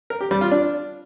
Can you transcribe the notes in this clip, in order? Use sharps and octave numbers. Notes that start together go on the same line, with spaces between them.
A#4
G4
G3
F4
D4